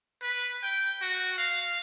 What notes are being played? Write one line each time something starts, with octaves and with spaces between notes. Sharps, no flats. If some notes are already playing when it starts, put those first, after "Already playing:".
B4
G5
F#4
F5